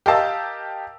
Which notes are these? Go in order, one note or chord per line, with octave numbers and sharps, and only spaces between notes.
G4 A#4 D#5 F5 A5 E6